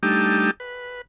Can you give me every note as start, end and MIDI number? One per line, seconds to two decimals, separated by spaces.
0.03 0.51 55
0.03 0.51 57
0.03 0.51 62
0.03 0.51 63
0.03 0.51 67
0.60 1.02 71